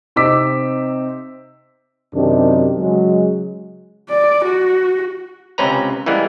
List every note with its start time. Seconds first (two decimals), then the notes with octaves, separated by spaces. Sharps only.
0.16 C3 C4 D#4 D6 E6 B6
2.14 F#2 C3 D#3 D4
2.79 C#3 F#3 G#3
4.09 D5
4.44 F#4
5.58 C#2 C3 C4 C#4 B4 A#5
6.06 E3 G3 G#3 A#3 B3